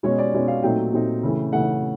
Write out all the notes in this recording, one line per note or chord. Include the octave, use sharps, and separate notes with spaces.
B2 G#3 C#4 C#5
D5
B2 G#3 C#4
F5
A#2 F#3 A3 C4 D#4 G5
A#2 F#3 A3 C4 D#4
C#3 E3 A3
C#3 E3 A3 F#5